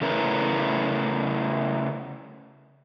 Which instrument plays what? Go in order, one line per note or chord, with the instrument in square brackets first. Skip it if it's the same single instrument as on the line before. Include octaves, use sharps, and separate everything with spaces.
[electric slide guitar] C#3 A3 C#4 E4 A#4 B4